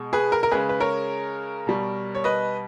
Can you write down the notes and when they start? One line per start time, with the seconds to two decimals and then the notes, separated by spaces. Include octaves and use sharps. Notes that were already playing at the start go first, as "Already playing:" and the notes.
Already playing: B2 G#3
0.13 G#4 B4
0.32 A#4
0.43 A#4
0.51 C#3 G#3 G#4 B4
0.69 B4
0.80 A#4 C#5
1.67 B2 G3
2.15 C#5
2.24 B4 D#5